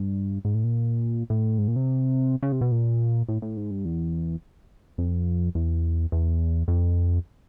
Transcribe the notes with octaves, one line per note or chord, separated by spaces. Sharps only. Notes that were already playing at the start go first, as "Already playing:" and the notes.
Already playing: G2
G#2
A2
A#2
A2
G#2
A#2
C3
C#3
C3
B2
A#2
A2
A2
G#2
G2
E2
F2
E2
E2
F2